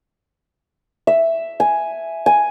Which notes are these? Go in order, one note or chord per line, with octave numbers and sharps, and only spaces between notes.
E5
G#5
G#5